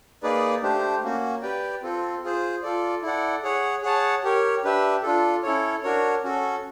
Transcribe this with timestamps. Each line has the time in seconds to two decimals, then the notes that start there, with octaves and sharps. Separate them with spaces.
0.23 A#3 D#4 G#4 B4 D5
0.63 A3 D4 G4 C5
1.03 A#3 C#4 F#4
1.42 G4 B4 D5 G5
1.82 C4 F4 A4
2.24 F4 G#4 C5
2.63 F4 A4 D5
3.02 E4 A4 D5 F#5
3.43 G#4 C#5 F#5
3.83 G#4 C#5 F#5 A5
4.24 G4 A#4 C#5
4.64 D4 G4 B4 E5
5.03 D4 F4 A4
5.43 C#4 E4 A4 C#5
5.83 D4 F#4 A#4 C#5
6.23 C#4 F#4 A4